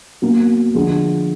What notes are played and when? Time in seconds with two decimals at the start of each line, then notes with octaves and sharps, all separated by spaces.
0.22 B2 F#3 A#3
0.75 D3 F3 G#3